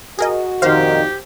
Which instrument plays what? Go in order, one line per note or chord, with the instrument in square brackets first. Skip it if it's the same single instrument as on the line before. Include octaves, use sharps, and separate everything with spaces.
[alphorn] F#4 [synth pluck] G#4 A#4 D#5
[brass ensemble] F2 A#2 D#3 [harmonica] G4 [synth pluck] C5 F5